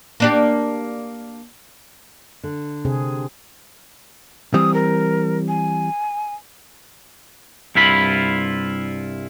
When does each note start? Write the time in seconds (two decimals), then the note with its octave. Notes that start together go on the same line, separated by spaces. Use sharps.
0.20 A#3 D4 G4
2.43 D3
2.85 C3 C4 G#4
4.54 E3 G3 C4 D#6
4.74 A#4
5.48 G#5
7.75 C2 G2 E4 F4 B5